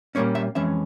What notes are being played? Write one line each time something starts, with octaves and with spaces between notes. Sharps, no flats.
A#2 G3 A#3 C#4 C#5
E5
F2 E3 G#3 C#4 E5